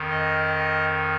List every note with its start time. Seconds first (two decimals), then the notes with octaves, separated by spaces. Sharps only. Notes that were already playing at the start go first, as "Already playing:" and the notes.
Already playing: F2 D#3
0.10 D#5